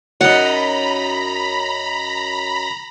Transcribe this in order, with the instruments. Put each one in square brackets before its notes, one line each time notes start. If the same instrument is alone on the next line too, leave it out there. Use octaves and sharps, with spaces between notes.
[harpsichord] F#2 D#4 [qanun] F#5 [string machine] A#5 B5